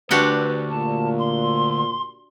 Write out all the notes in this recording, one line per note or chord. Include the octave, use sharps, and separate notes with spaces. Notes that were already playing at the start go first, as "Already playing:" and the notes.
D2 D4 F#4 G4 B4
A#2 A5
C6